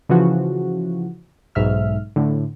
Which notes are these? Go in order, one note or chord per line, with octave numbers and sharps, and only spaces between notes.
C#3 E3 F3 F#4
B1 G#2 E5 F6
A2 D3